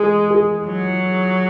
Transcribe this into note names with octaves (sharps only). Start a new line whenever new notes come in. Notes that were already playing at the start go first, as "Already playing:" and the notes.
Already playing: G#3 G#4
G#4
F#3